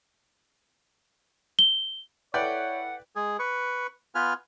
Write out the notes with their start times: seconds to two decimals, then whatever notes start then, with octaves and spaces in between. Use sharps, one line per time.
1.59 G7
2.34 E4 A4 B4 C#5 D5 F#5 G5
3.15 G#3 G#4
3.39 B4 C#6
4.15 B3 F4 B4 G#5 F6